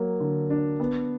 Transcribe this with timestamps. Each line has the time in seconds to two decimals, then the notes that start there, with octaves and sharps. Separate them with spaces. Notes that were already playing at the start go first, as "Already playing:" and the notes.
Already playing: F#3 A#3
0.20 D3
0.50 D4
0.80 B3